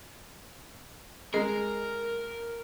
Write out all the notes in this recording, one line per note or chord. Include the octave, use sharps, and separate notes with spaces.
G#3 A#4 D#5